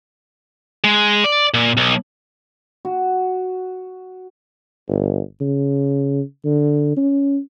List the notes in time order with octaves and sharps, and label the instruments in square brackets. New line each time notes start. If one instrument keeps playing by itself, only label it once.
[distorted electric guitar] G#3
D5
A#2
B1
[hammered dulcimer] F#4
[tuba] G1
C#3
D3
C#4